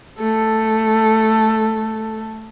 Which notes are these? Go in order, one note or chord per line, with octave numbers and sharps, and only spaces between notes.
A3 A4